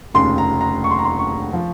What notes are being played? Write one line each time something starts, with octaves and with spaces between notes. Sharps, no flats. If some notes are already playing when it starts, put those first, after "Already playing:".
F1 D#2 C#3 C6
A#5
A#5
C#6
C6
A#5
C6
C#6
F3